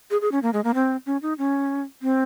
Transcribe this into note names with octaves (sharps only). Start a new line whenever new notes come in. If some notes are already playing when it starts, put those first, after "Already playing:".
G#4
G#4
C#4
A#3
G#3
A#3
C4
C#4
D#4
C#4
C4